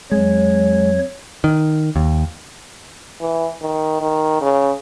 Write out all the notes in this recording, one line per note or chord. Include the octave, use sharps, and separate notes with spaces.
F2 F#3 G#3 C#5
D#3
D#2
E3
D#3
D#3
C#3